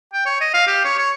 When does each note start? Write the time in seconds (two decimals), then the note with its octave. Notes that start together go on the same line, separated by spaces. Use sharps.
0.13 G5
0.26 C#5
0.41 D#5
0.54 F5
0.67 G4
0.85 C#5
0.98 C#5